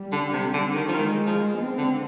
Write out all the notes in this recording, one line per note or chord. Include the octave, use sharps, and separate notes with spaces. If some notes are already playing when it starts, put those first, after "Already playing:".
Already playing: G3
D3
C3
D3
D#3
F3
D#3 G#3
F3
C4
D3